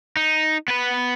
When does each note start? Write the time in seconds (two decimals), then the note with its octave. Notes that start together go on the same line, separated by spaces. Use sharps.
0.16 D#4
0.68 B3 B4